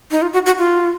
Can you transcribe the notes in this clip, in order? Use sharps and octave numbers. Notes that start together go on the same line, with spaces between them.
D#4
F4
F#4
F#4
F4